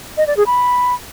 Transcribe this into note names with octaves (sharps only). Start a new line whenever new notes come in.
D#5
D5
G#4
B5